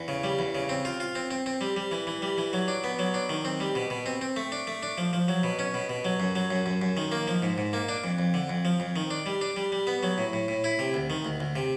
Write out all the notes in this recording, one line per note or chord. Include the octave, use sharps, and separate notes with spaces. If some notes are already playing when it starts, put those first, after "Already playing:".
Already playing: E2
C#3
G3
E2
C#3
C4
F4
F4
C4
C4
C4
G3
G3
E3
E3
G3
E3
F#3
D4
B3
F#3
D4
D#3
C4
G3
B2
B2
C4
C4
A3
D4
A3
D4
F3
F3
F#3
B2
C#4
B2
B2
F#3
F#2
F#3
F#2
F#2
F#2
D#3
A#3
F3
G#2
G#2
A#3
D4
F2
F2
D3
F2
F3
F2
D#3
D4
G3
D4
G3
G3
B3
F#3
A2
A2
A2
E4
C3
D2
D#3
D2
D2
C3